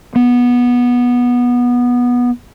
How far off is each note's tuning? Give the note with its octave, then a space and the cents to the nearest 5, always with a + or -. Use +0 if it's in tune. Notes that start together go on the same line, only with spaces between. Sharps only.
B3 -15